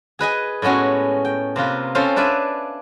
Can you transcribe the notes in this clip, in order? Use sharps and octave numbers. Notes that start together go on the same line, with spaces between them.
G#4 B4 D#5 G#5
A2 G#3 B3 C#4 F#4
G5
C3 A#3 F4 B4
C4 C#4 F4 A4 C5 F5
D4 B4 D5 E5 F5 G#5